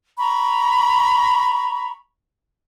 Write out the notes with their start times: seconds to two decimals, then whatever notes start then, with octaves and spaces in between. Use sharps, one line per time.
0.18 A#5 B5 C#6